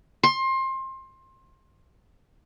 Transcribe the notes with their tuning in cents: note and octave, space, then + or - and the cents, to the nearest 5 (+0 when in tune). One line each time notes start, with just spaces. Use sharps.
C6 +25